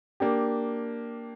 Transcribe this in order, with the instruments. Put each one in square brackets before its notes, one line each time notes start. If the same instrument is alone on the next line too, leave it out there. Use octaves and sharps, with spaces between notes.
[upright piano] A#3 D4 G4